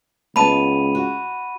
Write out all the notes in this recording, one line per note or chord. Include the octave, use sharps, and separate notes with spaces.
C#2 G#3 B3 A5 B5 D#7
F#4